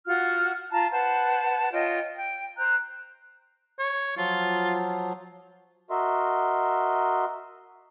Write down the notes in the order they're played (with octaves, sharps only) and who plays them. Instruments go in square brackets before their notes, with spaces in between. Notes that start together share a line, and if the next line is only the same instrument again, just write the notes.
[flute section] F4 F#4 F#5 F6
F4 A5 A#5
B4 C5 F#5 A5
F4 C#5 D#5 G5
G5
C5 A#5 F#6 G6
[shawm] C#5
[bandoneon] F3 F#3 [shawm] F4
[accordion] F#4 A#4 D#5 E5 C6